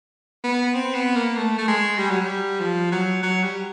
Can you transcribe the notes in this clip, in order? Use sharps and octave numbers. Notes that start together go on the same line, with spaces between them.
B3
C4
B3
A#3
A3
A3
G#3
G3
F#3
G3
F3
F#3
F#3
G3